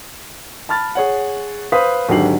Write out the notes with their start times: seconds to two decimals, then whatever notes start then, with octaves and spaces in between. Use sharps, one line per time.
0.69 A5 B5 F6 A6
0.95 G#4 C#5 F#5
1.72 B4 C5 F5 D#6 B6
2.09 G#1 D3 F#3 G4 C7 F#7